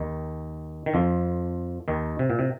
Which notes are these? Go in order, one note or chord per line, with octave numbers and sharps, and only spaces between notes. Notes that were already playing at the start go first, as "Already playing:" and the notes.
Already playing: D#2 D#3
D#3
F2 F3
D#2 D#3
C3
A#2
C3